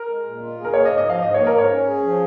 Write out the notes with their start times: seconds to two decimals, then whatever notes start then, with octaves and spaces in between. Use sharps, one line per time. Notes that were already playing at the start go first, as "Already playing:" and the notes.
Already playing: A#4
0.09 G#3
0.25 A#2
0.42 F4
0.58 G#4
0.65 A#4
0.74 A#3 C#5
0.85 D#5
0.90 G#2
0.98 D#5
1.06 F3 F5
1.22 G#2 D#5
1.34 A#3 C#5
1.47 A#4
1.54 G#2 C#5
1.71 C#4
1.87 G#4
2.03 F3